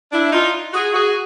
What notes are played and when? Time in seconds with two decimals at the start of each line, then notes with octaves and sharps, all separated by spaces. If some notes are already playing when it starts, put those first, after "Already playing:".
0.13 D4 E4
0.32 D#4 F4
0.74 F#4 G#4
0.94 F#4 G#4